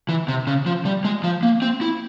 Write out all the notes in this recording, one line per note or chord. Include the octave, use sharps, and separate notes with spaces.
E3
C3
C#3
F3
G3
G#3
F3
A#3
C4
E4